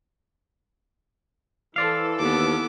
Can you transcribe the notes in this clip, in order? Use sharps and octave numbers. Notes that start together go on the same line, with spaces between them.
E3 A4 C5 D5 F5
D#2 B3 D6